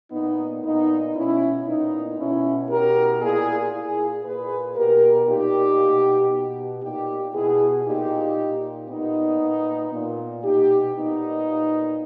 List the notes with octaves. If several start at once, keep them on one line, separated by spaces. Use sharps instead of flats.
A#2 B3 D#4
A#2 B3 D#4
B2 C#4 E4
A#2 B3 D#4
B2 C#4 E4
B2 G4 A#4
A#2 E4 G#4
A#2 E4 G#4
A#2 G#4 B4
B2 G4 A#4
A#2 D#4 G4
B2
B2
A#2 D#4 G4
B2 E4 G#4
A#2 D#4 G4
A#2
A#2 B3 D#4
A#2
A#2
B2 D#4 G4
A#2 B3 D#4
A#2